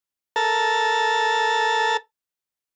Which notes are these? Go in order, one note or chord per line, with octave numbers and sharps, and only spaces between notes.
A4 A#4 A5